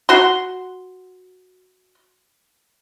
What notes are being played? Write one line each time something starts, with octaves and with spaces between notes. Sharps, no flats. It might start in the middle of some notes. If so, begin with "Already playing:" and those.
F#4 C6